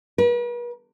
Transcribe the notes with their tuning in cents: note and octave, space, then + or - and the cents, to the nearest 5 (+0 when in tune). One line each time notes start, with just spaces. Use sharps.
B4 -45